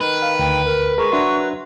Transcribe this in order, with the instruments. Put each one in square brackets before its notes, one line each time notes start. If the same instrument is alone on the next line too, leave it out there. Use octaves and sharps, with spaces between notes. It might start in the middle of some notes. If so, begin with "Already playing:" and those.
[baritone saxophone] D#3 [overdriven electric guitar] B4
[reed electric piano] F5
[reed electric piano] D2 [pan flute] G5
[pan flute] A#4
[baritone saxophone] G#3 [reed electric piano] A#4 [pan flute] C#6
[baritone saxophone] F#3 [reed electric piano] D4 E5 C6